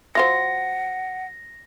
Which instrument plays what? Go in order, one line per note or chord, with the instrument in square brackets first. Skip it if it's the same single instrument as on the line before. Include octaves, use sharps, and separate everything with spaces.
[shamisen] F#3 F4 C5 [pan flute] F#5 [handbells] A#6